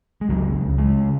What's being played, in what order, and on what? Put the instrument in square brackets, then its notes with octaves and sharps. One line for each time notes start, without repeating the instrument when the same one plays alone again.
[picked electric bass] G#3
C#2 F#3
C#3
C#3 G#3